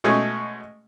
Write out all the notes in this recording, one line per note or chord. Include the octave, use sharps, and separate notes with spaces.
B2 G#3 A3 C#4 G#4